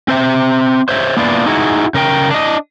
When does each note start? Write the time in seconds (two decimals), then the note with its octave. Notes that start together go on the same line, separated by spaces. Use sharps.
0.08 C4 C5 E5
0.89 C5 C#5 E5
1.17 A#3 B3 D4 E4 F4 D5
1.46 D#4 E4 F#4 G#4
1.94 C#3 A#4 D#5 G5
2.31 D4 D#5